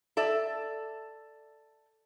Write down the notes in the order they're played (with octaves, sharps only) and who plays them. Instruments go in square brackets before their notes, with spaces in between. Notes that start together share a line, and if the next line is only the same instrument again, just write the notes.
[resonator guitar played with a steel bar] A4 D5 E5